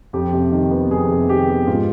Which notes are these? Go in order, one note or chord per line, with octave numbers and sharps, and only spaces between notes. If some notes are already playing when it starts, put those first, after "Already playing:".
F2 G4
C3
D#3
B3
F2 G#4
C3
D#3 G4
B3
G#2 F4